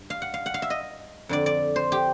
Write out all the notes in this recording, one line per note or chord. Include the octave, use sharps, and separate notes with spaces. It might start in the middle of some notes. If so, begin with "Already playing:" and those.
Already playing: G2
F5
F#5
F5
F#5
F5
E5
D#5
F2 D3 D5
D5
C5
G4